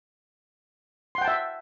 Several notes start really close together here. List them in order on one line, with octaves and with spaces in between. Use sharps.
C6 F#5 G5 A5 E5